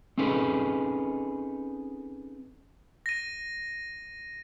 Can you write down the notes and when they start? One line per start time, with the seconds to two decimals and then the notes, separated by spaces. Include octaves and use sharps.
0.18 C4 C#4 D#4 G#4 A4 B4
3.06 A#6 D#7